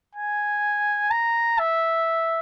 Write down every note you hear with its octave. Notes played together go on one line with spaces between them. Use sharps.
G#5
A#5
E5